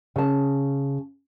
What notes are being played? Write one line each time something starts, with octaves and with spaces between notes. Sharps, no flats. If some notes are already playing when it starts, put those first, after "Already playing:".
C#3 A5